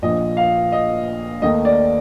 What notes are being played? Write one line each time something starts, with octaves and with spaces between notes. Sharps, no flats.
A#1 A#2 F3 D#5
F5
D#5
D#2 D#3 A3 D#5
D5